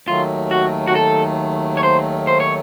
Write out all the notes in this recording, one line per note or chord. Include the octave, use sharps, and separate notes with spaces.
D#2 D#3 F#3 A3 F4
F#4
F#4
A4
C#5
C5
C5
C#5